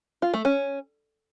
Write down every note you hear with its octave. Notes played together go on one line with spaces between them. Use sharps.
F4
A3
C#4